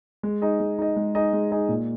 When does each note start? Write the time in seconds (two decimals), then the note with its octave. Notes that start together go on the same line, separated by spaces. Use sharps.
0.23 G#3
0.42 D#4 G#4 D#5
0.60 G#3
0.79 D#4 G#4 D#5
0.96 G#3
1.15 D#4 G#4 D#5
1.33 G#3
1.52 D#4 G#4 D#5
1.69 A#2